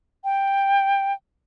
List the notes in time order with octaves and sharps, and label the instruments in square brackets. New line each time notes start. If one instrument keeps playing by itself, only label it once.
[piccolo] G5